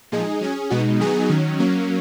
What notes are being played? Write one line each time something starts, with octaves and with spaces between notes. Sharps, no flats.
A#2 F3 G#3 D#4 G#4
F#3 C#4 G#4
B2 G#3 B3 D#4 F#4
D#3 F#3 B3 D#4 G#4
D#3 F#3 C#4
F#3 A#3 C#4